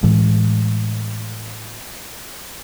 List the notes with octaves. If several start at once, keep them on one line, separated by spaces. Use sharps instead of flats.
A2 E3 G#3